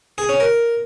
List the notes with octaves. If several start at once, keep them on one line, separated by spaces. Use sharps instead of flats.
G#4
C#4
A#4